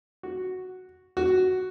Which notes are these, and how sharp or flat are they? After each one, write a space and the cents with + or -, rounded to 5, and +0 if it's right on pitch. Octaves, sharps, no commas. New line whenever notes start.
F#4 +0
F#4 +5